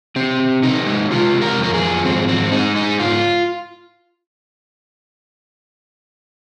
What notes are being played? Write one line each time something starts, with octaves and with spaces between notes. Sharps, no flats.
C3 C4
C3
C3 D#4
G#3
G#3 F4
C3
A#4
F2
A#4
G#4
F3
G#2 C4
G#2 C4
G#3 D#4
G#2 D#4
G#2 F4